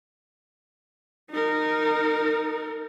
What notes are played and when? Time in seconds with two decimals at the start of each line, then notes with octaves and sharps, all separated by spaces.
1.31 D#4 A#4